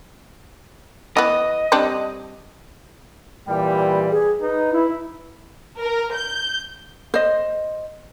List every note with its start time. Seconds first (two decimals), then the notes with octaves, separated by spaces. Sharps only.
1.17 E3 B3 D#5
1.72 G3 C4 D4
3.48 A#2 E3 G3 G5
4.11 G#4
4.42 D#4 B4
4.72 E4
5.80 A#4
6.14 G6
7.14 C5 D#5